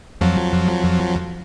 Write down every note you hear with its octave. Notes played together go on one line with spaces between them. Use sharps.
F2 F3 F#3